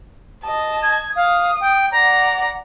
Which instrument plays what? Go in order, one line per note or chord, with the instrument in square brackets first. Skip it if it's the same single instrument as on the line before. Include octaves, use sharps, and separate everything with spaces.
[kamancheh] D#5 A5
[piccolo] G#6
[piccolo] F5 [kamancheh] D#6
[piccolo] G5
[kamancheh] D5 F#5 [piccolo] A#5